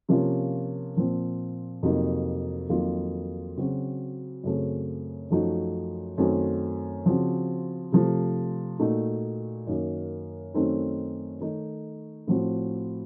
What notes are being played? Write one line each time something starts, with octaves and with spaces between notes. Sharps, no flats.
C3 F3 A#3 C#4 F4
A#2 F3 C4
F2 C3 F#3 A#3 D#4
F2 D#3 F#3 A#3 F4
C#3 F#3 C4 F#4
F#2 C#3 A3 C4
F#2 F3 A3 D#4 F#4
F#2 D#3 A3 C4 F#4
C#3 F3 C4 F#4
C3 F3 A3
A#2 A3 D#4 F#4
F#2 D#3 A#3
F#2 D#3 A3 C4 D#4
D#3 A3 D#4
A2 F3 C4 F#4